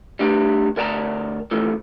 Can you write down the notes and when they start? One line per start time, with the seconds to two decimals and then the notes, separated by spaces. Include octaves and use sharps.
0.19 G3 A3 D4 D#4 G4
0.76 D2 A#4 D5 G5 A5 A#5
1.51 C#3 E3 F3 A3